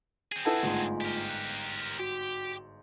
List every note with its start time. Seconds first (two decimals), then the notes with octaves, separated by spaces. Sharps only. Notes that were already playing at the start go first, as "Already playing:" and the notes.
0.32 C4 G#4
0.45 E4 A4 B4 F#5 A5 G#6
0.63 G1 G#2 A3 F4 G#5
1.01 G4 A#4
1.29 F#6
1.99 F#4 G4